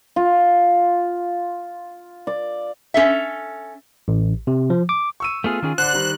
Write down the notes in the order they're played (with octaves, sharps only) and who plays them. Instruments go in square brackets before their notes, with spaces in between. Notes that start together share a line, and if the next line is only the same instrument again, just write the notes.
[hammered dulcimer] F4
D5
[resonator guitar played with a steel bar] C#4 A4 E5
[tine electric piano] A1
C3
F3
D6
[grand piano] C#6 E6 D#7
[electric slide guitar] A3 B3 G#4 [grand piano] F4 F6
[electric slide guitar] D#3 C#4 G#4
[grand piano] D3 D4 [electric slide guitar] C5 [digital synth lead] F#6
[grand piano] D#3 G3